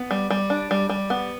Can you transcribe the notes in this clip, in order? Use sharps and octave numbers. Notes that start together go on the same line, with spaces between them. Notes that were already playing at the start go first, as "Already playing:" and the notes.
Already playing: B3
G3
G3
D4
G3
G3
B3